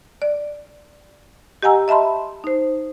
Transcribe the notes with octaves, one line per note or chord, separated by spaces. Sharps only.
D5
G4 D#5 F#5 G#5 A#5 E6
D#5 E5 A5 B5 C6
D#4 C5